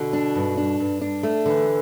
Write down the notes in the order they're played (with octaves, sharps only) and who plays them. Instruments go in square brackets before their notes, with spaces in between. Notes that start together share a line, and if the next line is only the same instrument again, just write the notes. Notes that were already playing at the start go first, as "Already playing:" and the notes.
Already playing: [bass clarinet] B2 [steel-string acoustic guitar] D3
[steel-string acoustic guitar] D4
G2
D4
G2
D4
A3
[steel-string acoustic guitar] D3 [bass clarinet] E3